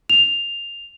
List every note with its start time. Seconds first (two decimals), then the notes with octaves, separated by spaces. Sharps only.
0.10 F7